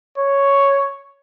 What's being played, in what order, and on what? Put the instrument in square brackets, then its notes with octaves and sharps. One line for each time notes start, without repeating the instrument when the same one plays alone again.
[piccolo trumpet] C#5